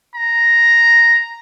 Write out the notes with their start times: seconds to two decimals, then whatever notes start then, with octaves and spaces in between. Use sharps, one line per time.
0.15 A#5